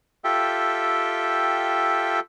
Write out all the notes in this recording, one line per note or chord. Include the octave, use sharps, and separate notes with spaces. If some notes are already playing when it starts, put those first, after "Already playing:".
F4 G4 A4 E5 G5